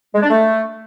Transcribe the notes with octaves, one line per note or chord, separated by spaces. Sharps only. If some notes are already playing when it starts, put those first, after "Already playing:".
G#3
D4
A3